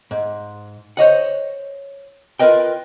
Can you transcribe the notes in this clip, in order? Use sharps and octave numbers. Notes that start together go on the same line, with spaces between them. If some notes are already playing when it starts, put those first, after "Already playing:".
G#2
C5 C#5 D#5 F#5
F4 A#4 B4 D#5 G5